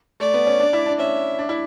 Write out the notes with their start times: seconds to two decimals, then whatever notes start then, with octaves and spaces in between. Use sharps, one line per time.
0.20 A3 D5
0.34 B3
0.47 C#4
0.60 D4
0.73 E4
0.86 D4
0.99 C#4 E5
1.39 D4
1.49 E4